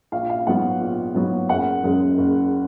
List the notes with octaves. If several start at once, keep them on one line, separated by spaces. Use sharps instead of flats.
A#1 F5
F5
G#2 F#3 B3 F#5
A#1
G#2 F#3 B3
F#1 F#5
F#2 C#3 G#3
F#1